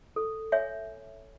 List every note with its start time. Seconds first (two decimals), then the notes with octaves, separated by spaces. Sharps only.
0.16 A4
0.52 C#5 E5 G#5